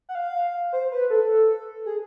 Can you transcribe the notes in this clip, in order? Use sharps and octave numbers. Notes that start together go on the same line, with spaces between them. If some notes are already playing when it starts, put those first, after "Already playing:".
F#5
F5
C5
B4
A4
G#4